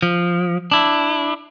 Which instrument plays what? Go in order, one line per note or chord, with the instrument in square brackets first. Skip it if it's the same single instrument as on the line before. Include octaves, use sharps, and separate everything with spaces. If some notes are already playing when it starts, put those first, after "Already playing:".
[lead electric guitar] F3
D4 E4